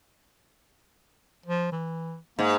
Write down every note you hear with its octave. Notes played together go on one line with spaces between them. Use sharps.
F3
E3
G#2 A#3